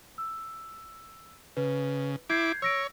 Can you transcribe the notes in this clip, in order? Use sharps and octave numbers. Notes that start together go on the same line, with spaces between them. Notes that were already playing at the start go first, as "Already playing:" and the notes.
E6
C#3 B4
E4 D6 G6 G#6 C7
C#5 E6 A#6 D7